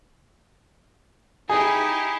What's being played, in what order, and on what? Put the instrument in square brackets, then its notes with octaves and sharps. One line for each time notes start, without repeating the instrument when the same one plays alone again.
[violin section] D#4 E4 G4 [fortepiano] G#4